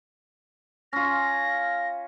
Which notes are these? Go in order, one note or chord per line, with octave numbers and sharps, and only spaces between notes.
C#4 F4 A#6